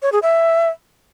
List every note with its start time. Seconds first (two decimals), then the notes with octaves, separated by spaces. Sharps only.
0.02 C#5
0.12 G#4
0.22 E5